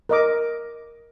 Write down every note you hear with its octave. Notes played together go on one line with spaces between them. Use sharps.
A#4 D#5 D6